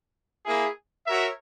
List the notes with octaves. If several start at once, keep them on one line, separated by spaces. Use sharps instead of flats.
A#3 E4 G#4
F#4 A#4 C#5 E5